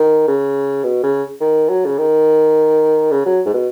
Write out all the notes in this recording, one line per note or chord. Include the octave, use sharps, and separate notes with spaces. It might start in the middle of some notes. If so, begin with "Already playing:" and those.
Already playing: D#3
C#3
B2
C#3
D#3
F#3
C#3
D#3
C#3
F#3
G#2
B2